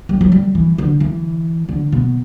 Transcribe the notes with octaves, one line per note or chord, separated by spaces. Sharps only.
G3
F#3
G3
E3
D3
E3
D3
B2